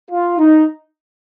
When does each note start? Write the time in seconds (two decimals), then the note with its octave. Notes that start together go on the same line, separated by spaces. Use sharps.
0.10 F4
0.39 D#4